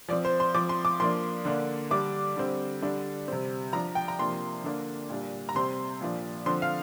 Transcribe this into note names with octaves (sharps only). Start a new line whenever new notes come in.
F3 C4 D5
C5
C6
F3 C4 D6
C6
D6
F3 A#3 D4 C6
D3 A#3 D4
D3 G3 D4 D6
D3 G3 C4
D3 G3 D4
C3 G3 C4
F3 D4 A#5
G5
A#5
C3 F3 A#3 D4 C6
D3 A#3 D4
A#2 G3 D4
A#5
C3 G3 C4 C6
A#2 F3 D4
D3 F3 C4 C6
F5